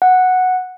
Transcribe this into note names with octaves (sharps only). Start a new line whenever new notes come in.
F#5